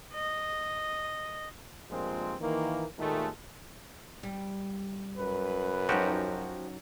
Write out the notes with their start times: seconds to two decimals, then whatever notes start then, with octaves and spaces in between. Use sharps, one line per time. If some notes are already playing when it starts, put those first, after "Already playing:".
0.14 D#5
1.90 G2 A#2 F3 G#3 A#3 C4
2.41 D#3 E3 A#3
2.99 D#2 A#2 D#3 G#3 A3
4.23 G3
5.17 F#2 B4
5.89 F3 F#3 C#4 D#4 F#4 G4